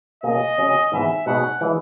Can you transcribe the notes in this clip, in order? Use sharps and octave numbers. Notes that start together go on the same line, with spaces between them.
B2 A#3 C#4 G#4 C#5 D#5
C#3 F#3 C#4
G#2 E3 B3 E4 G#4 E5
B2 G#3 D#4 G#4 F#5
E3 G#3